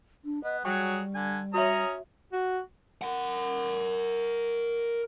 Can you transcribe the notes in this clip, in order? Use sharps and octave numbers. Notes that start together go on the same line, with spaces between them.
D4
B3 D#5
F#3 G3 G#4 G5 C#6
D3 G#5
C#4 F#4 C#5 E5 A#5 D#6
F#4
A#4 F#5